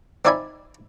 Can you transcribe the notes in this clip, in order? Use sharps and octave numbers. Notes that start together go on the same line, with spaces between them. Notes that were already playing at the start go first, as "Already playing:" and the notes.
C4 D#4 D5 E5 G#5 B5